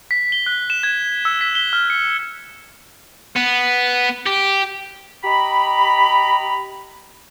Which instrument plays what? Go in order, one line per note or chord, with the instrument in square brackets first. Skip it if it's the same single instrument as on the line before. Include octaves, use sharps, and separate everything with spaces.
[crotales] B6
G7
F#6
E7
G#6
E6
B6
G7
F6
C#7
[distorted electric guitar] B3
G4
[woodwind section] G4 D#5 A#5 B5